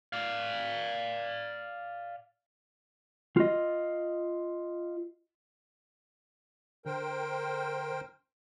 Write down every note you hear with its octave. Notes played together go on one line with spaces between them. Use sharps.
D5 F5
F4 D#5
D3 A#4 C5 G5